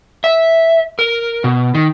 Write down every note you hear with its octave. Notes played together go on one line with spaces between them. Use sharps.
E5
A#4
B2
D#3